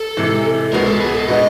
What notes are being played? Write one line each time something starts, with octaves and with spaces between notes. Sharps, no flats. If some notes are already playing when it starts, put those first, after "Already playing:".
Already playing: A4
C3 E3 G#3
C#2 B2 G#3 B3 A#4
A4
G#4
A4
B2 G#3 B3 D#4 D#5